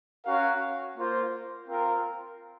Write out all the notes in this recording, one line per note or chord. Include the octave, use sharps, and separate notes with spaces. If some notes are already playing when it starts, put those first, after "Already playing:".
C#4 F#4 A#4 F5
A#3 F4 C5
C4 F4 A#4